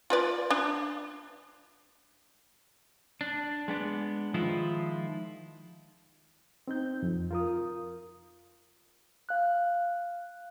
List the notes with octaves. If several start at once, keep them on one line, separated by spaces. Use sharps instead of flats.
F4 B4 D5
D4
D4
G#3 B3 D4
D#3 F3 G#3 E4 F4
C4 D#4 G6
F2
F4 A#4 D#6
F5 F#6